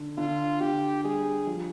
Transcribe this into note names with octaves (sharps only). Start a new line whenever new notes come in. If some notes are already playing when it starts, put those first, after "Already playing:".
Already playing: D3
D3 F4
D3 G4
G3 G#4
F3